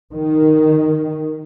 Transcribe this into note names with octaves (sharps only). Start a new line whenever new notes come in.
D#3